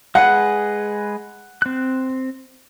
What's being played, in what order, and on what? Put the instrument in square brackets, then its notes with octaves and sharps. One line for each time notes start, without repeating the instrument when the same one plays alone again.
[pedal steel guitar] G#3 G#4 B4 [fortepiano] F#5
[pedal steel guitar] C4 F#6